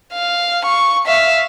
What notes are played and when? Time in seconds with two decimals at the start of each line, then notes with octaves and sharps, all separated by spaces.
0.13 F5
0.65 C#6
1.06 E5 F5